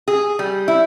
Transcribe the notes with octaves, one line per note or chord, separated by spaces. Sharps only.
G#4
G3
E4